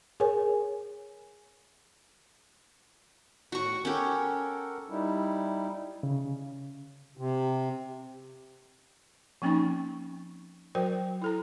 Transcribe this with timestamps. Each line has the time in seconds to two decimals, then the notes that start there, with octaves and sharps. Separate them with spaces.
0.20 G#4 A#4 C#5 G#5
3.52 A2 F#4 C#6
3.85 C#4 G4 A4 A#4 F#5
4.90 G3 D#4 E4
6.03 C#3
7.17 C3
9.42 F3 A#3 C4 C#4 D#4 C#6
10.75 F#3 F#4 A#4 C5 G5
11.22 E4 A4 A#5